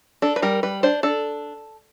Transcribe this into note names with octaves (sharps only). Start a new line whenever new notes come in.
D4 A4
B4
G3 A#4
G3 B4
D4 C5
D4 A4